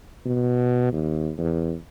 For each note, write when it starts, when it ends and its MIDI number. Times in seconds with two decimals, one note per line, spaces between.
0.26 0.92 47
0.93 1.31 39
1.38 1.74 40